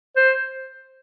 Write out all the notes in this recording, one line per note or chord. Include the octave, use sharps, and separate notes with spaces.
C5